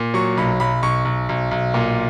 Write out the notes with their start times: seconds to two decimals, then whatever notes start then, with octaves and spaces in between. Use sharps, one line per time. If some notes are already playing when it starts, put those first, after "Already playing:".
Already playing: A#2
0.14 F#3 C#6
0.37 B1 B5
0.60 B1 B5
0.82 B1 C#6
1.05 B1
1.29 B1
1.51 B1
1.74 A#2